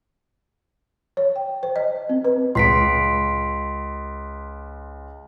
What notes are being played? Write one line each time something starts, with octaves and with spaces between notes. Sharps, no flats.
C#5
G5
C5
D#5
C4
B4
C#2 C6 B6 D7